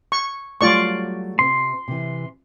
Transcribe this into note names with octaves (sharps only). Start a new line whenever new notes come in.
C#6
F#3 G3 A3 F4 D5 C#6
C3 C4 C6
C3 E3